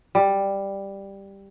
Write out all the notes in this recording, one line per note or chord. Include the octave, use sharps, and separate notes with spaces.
G3